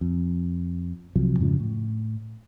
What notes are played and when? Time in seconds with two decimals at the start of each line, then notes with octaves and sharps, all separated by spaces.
0.01 F2
1.16 C2 C3 F3 F#3
1.39 F2 G#2 C#3 F3
1.60 A2